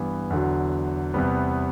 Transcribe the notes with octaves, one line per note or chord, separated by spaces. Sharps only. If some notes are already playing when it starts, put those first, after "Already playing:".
Already playing: G2 E3 B3
E2 D3 F#3
E2 C3 G3 B3